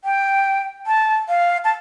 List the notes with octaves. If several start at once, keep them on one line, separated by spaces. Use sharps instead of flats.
G5
A5
F5
A5